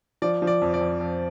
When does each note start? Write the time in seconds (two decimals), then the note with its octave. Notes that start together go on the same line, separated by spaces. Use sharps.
0.22 F3 D5
0.42 F3
0.47 D5
0.62 F2
0.74 D5
0.81 F2
1.01 F2